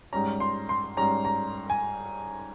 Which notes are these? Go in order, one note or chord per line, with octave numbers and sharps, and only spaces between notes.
G#2 G3 C#4 A#5
C6
C6
G#2 G3 C#4 A#5
A#5
G#5